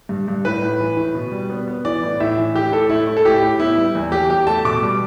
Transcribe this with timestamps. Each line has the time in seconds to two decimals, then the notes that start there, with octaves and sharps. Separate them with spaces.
0.09 G2
0.28 G2
0.45 A2 B4
0.62 A2
0.80 E3
0.97 A2
1.15 B2
1.32 G3
1.50 B3
1.68 B3
1.85 E3 D5
2.03 A2
2.20 A2 E5
2.38 E3
2.55 A2 G4
2.72 A2 A4
2.90 A3 E4
3.07 A3
3.17 A4
3.25 A2 G4
3.43 A2
3.60 B3 E4
3.78 G3
3.95 E2
4.12 E2 G4
4.30 E2 G4
4.47 A3 A5
4.65 B2 D6
4.82 G3